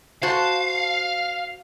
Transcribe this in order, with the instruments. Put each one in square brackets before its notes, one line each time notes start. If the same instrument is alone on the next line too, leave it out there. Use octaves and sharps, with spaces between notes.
[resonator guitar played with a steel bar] F#4 C5 A5 [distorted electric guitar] F5